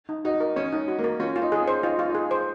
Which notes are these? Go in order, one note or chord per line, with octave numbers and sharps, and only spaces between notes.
D#4
D#4 F#4
A#4
C#4 C#5
D#4
F#4
A#3
A#4
C#4 F4
F4
D#4
G#4
C#4
C5
D#4 F4
F4
D#4 G#4
C5